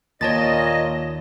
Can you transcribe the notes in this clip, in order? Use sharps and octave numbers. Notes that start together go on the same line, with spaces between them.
D#2 A#2 D#3 C#5 D#5 A5 A6